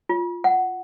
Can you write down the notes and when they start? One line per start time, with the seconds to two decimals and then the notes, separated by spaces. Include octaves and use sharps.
0.09 F4
0.44 F#5